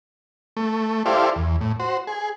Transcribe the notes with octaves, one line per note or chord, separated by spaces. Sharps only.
A3
E4 G4 A4 C5 D5 F5
E2
A2
F#4 C5
G#4